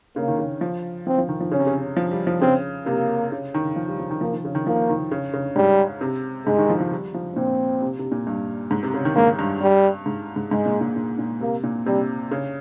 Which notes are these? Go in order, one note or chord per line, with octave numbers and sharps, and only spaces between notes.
C#3 A#3
D#3
C#3
F3
F3 C4
F3
D#3
F3
C#3 C#4
C3
C#3
F3
G3
F3
C#3 C4
C3 A#3
C#3
D#3
F3
G3
F3
D#3
F3 A#3
D#3
C#3
D#3
F3 A#3
D#3
C#3
C#3
G#2 G3
C3
G#2 G#3
D#3
F3
F3
G3
F3
A#2 C4
C3
C3
A#2
G2
G#2
C3
C#3
D#3
G#2 A#3
G2
G3
G#2
G#2
G#2 G#3
A#2
A#2
A#2
A#2
C3 A#3
A#2
C3 G3
C#3